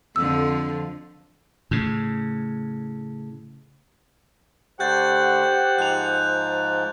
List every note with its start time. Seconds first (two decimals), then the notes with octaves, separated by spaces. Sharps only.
0.16 F2 D3 F3 E6
1.71 A2 C#3
4.80 D3 A3 G4 C5 F#5 F#6 G6 A6
5.43 G6
5.78 G#2 F3 G#3 F#6 F7